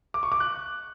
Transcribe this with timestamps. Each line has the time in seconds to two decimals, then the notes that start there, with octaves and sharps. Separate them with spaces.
0.14 D6
0.23 C#6
0.32 D6
0.40 F#6